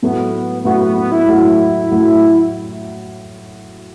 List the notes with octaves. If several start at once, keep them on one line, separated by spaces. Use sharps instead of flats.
A2 F#3 A3 B3 F#4
A2 F#3 A3 B3 F#4
B3
B3
E4
A2 F#3 A3 F#4
A2 F#3 A3 F#4